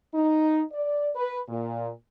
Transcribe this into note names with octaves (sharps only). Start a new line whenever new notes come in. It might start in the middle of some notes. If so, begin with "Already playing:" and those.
D#4
D5
B4
A#2